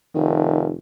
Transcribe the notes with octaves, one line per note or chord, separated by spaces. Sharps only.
F1 D#3